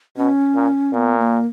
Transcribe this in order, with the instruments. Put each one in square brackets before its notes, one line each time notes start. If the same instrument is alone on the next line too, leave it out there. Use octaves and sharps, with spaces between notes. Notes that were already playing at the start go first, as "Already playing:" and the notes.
[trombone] B2 [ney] C#4
[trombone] A#2
[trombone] A#2 [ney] B3
[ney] A#3